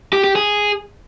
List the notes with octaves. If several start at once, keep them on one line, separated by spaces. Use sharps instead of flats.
G4
G4
G#4